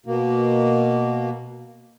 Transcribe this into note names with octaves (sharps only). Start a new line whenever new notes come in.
B2 A#3